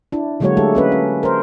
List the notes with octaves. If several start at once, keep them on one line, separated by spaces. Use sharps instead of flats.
D4 E4
D3 F#3 G#3 A#3 F#4 C#5
G#3 A3 G4 A4
A#3 C#4 B4
C#4
A#4 C5